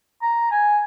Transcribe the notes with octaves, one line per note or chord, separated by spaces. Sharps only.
A#5
G#5